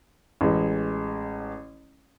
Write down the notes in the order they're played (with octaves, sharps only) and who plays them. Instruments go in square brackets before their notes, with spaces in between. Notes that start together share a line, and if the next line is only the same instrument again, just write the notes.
[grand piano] A1 G#3